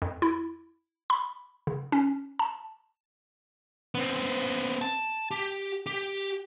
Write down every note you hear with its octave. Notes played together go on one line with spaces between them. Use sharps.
F2
E4
B5
C#3
C#4
A5
B3 C4
A5
G4
G4